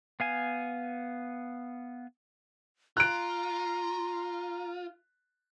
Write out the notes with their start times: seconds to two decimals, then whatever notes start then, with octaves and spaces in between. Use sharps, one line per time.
0.20 B3 F5 G#5
2.97 F4 A#5 F#6 D7